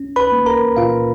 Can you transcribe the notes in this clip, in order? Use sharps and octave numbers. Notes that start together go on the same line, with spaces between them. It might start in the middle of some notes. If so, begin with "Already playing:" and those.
Already playing: C#4
B4 B5
A#3
A#4 A#5
A#2 F4 F5